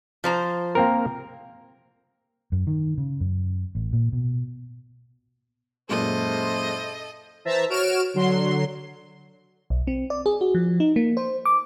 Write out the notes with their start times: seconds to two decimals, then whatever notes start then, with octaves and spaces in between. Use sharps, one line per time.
0.24 F3 C5 A#5
0.75 A#3 C4 A#4
2.52 F#2
2.67 D#3
2.98 C#3
3.20 F#2
3.75 A1
3.93 A#2
4.12 B2
5.89 F#2 A#2 G#3 E4 G#4 A4 C5 D#5
7.45 E3 C5 E5 A5 A#5
7.70 F#4 C#5 F6 D7 E7
8.14 D3 F#3 C6
9.70 B1
9.87 C4
10.10 D5
10.26 G#4
10.41 F#4
10.55 F3
10.80 D#4
10.96 A#3
11.17 C5
11.46 D6